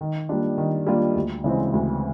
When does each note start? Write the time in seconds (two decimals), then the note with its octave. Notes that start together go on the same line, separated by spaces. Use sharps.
0.01 D#3
0.29 G3 A#3 D4 F4
0.58 D#3
0.87 G3 A#3 D4 F4
1.15 D2
1.44 C#3 E3 G#3 C4
1.73 D2